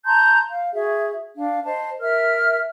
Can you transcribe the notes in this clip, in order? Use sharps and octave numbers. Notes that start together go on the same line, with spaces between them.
A5 A#5 C6 G6
F5
F#4 G#4 E5
D4 F5
C5 D#5 A5
A#4 E5 F6